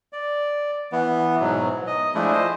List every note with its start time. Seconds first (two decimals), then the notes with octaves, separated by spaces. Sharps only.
0.13 D5
0.92 E3 B3
1.40 G#2 B2 F#3
1.87 D#5
2.15 F3 G#3 A3 D4 E4
2.32 C5 D#5